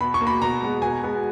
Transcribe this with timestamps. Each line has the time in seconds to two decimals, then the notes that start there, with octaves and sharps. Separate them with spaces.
0.01 B2 B5
0.14 C#6
0.21 A#3
0.27 B5
0.42 B2 A#5
0.62 G#3 B3
0.82 B2 G#5
1.03 G#3 B3